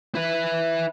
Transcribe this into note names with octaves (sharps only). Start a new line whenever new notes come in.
E4 B4